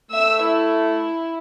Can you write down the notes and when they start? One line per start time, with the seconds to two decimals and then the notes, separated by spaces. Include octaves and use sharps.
0.11 A3 E5 E6
0.42 E4